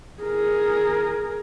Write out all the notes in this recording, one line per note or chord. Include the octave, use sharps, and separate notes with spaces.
G#4 A#4